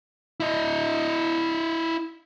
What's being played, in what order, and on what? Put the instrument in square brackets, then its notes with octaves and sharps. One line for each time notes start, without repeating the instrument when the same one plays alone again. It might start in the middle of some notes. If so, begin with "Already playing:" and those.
[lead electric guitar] E4 D#5